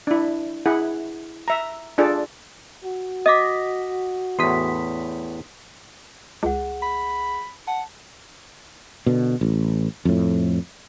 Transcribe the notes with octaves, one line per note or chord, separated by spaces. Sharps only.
D4 E4
E4 G#4 F#5
E5 A#5
D4 F4 G#4 A4 D5
F#4
D#5 D6 D#6 A#6 B6
E2 A2 C6 D#6 B6
C#2 G#4 F#5
B5
F#5 A5
B2 D3
A1
F2 A2